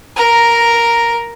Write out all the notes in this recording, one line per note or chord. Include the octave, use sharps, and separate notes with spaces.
A#4 A#5